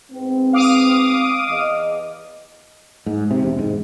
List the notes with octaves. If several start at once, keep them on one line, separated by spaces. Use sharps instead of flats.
G#2 B3 C4
F5 D6 D#6
E2 D#5
G#2
C3
E1
G#2